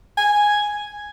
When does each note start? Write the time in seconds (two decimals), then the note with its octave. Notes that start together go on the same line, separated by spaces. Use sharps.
0.17 G#5